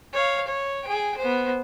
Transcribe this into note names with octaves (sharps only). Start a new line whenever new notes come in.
C#5 F5
C#5
G#4 G5
B3 C5